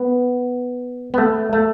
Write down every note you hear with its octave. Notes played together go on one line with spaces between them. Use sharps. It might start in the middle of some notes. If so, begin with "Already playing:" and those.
Already playing: B3
B3
A3
A3